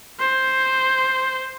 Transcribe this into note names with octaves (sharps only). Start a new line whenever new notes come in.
C5